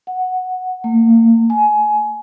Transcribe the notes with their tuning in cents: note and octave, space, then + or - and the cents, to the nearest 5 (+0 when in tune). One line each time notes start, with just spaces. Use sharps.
F#5 -5
A#3 -35
G#5 +20